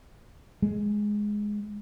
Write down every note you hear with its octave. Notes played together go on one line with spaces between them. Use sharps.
G#3